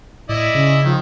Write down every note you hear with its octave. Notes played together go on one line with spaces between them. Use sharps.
A2 E4 D5 D#5
C#3 C#4
D#3 F3